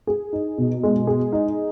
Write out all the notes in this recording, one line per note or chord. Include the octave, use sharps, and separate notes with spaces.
G#4
D#4
B2
G#3
G#4
D#4